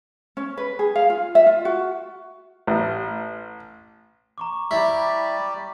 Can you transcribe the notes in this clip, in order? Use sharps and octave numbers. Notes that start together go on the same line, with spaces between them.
C#4
B4
G#4
F5
F4
E5
F4
F#4
A1
A#5 C#6 D6
G3 E4 G4 D5 A#5 B5 B6